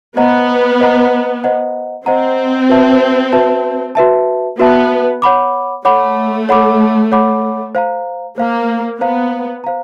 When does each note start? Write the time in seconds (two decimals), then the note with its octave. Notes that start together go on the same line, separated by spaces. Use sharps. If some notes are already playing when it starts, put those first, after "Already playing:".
0.17 B3 C5 D#5 F#5 A#5
0.80 C5 D#5 F#5 A#5
1.44 C5 D#5 F#5 A#5
2.06 C4 C5 D#5 F#5 A#5
2.69 F#4 B4 E5 A5
3.32 F#4 B4 E5 A5
3.95 F#4 B4 E5 A5
4.59 B3 F#4 B4 E5 A5
5.22 C#5 F#5 B5 D6
5.85 A3 C#5 F#5 B5 D6
6.49 C#5 F#5 B5 D6
7.12 C#5 F#5 B5 D6
7.75 C5 F5 A#5
8.38 A#3 C5 F5 A#5
9.01 B3 C5 F5 A#5
9.64 C5 F5 A#5